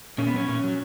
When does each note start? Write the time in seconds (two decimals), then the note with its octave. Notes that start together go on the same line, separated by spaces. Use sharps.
0.18 A#2 C#4
0.27 B3
0.34 F#3 C#4
0.48 A#2 C#4
0.64 F#3